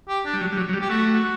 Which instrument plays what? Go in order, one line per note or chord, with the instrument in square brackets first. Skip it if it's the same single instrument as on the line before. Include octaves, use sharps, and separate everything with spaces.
[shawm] G4
D4
[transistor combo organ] G3
F#3
G3
F#3
F#3
G3
[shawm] G4
[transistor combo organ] A3 [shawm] F#4
[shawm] F#4